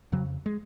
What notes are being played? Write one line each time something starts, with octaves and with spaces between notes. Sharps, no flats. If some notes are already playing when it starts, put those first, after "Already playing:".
F2 C#3 F#3
G#3